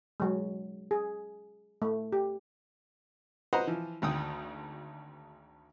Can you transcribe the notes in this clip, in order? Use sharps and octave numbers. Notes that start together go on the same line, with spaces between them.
F#3 G#3
G#4
A3
G4
B4 C5 D#5 F#5 A#5
E3 F3
G#1 D2 G5 D#6